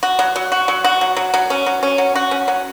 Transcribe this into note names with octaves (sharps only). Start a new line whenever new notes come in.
F#4
F#3
F#3
F#4
F#3
F#4
F#3
F#3
F#3
C#4
F#3
C#4
F#3
F#4
C#4
F#3